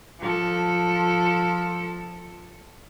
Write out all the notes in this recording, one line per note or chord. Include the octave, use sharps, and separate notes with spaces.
F3 A4